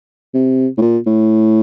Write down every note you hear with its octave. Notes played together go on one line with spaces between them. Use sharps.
C3
A2
A#2
A2